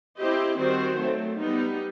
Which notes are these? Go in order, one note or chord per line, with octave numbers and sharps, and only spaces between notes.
C4 E4 G4 C5 D#5
D#3 G3 C4 F#4 C5
F#3 A3 C4
G3 B3 D#4